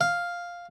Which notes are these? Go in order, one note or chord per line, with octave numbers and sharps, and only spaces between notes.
F5